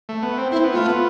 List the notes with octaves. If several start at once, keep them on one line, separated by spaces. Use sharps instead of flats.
A3
B3
C4
C4 E4
B3
A3 F4
B3